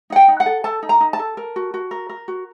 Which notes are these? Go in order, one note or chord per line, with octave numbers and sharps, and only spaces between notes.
D#4 F#5
G5
D#4
F#5
A4
A4 A5
D#4
A#5
D#4
A5
A4
A#4
F#4
F#4
A#4
A#4
F#4